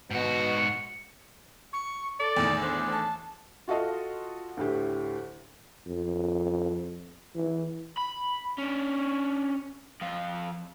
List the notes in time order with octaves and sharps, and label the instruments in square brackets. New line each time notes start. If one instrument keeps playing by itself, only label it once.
[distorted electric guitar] G#2 F#4 [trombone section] B2
[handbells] C#7
[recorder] C#6
[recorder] A4 [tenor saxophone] D5
[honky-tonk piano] E2 A2 D#3
[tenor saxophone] D4 [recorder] C5
[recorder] A5
[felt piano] F4 F#4 A4 D#5 F5
D2 A2 G4
[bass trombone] F2
E3
[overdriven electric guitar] B5
C#4 D4
F2 F4